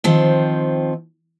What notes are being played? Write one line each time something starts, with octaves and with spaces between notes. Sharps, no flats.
D#3 F3 C4